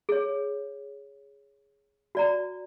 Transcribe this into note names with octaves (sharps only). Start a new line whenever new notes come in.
G#4 C#5
F#4 D5 A#5